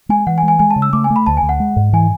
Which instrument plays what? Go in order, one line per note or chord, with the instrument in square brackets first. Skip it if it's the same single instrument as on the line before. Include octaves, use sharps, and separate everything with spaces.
[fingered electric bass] G#3 [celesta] G#5
[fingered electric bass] E3 [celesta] F#5
[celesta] G#5
[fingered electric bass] G#3
[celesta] G#5
[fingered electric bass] G#3 [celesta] G#5
[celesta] A5
[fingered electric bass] C#3
[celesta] E6
[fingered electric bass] A3 [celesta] D6
[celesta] G#5
[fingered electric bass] A3
[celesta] B5
[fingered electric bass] D2 [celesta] A5
[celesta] G#5
[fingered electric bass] D2
[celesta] F#5
[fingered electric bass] G#3
G#2
[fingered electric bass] E3 [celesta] G#5